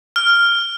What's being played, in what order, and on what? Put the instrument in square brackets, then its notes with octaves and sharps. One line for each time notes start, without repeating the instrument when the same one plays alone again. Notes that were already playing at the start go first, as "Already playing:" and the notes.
[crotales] F6